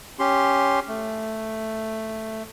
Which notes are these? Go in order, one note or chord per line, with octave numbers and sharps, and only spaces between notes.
C#4 G4 C6
A3